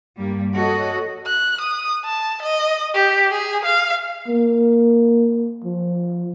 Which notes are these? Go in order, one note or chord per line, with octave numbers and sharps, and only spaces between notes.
G2 G3 A#3
F#4 A4 C#5 D#5
F#6
D#6
A5
D#5
G4
G#4
F5
A#3
F3